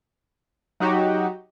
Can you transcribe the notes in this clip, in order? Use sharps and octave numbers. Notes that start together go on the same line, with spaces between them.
F#3 D#4 F#4 G4